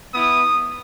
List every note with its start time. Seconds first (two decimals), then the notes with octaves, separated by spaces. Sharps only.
0.14 B3 E4 D#6